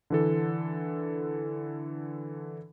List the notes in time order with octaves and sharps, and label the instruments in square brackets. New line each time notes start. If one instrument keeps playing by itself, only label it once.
[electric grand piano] D3 E3 A4